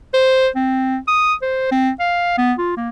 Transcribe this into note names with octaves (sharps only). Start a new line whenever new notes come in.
C5
C4
D#6
C5
C4
F5
B3
F4
A#3